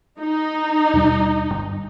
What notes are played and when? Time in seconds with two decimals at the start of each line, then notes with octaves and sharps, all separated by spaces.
0.19 D#4
0.93 D#2 B2 G3
1.50 G1 G2